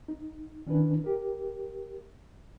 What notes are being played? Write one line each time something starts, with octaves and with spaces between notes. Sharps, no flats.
D#4
D#3 C#4 D4 E4 B4
G4 A#4